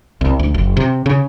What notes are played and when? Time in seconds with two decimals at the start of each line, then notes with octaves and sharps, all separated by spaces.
0.21 C2
0.39 D2
0.54 F#1
0.77 C3
1.06 C#3